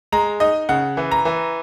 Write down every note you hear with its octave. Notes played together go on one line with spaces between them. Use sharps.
G#3 A#5
D#4 D#5
C#3 F#5
E3
A#5
E3